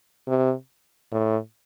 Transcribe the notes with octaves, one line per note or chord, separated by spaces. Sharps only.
C3
A2